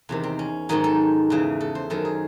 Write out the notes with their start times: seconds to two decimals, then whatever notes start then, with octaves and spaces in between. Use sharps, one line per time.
0.09 E2 C3 D#3
0.23 C4
0.39 C#4
0.69 G#2 D#3 F#3 D#4
0.84 A4
1.30 E2 C#3 E3
1.61 A4
1.75 C5
1.90 F#2 D#3 F#3 A4
2.05 G#4